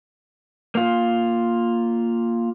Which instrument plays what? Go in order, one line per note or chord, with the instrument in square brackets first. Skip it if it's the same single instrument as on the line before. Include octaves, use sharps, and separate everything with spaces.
[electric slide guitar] A#3 F4